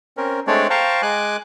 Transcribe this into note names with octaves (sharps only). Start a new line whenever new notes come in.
C4 C#4 A#4
G#3 A3 C4 D4 C#5 D5
C5 F5 G5 A5 A#5 C#6
G#3 G#5 D6 F#6